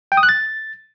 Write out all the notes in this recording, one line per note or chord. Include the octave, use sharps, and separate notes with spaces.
G5
D#6
F#6
A6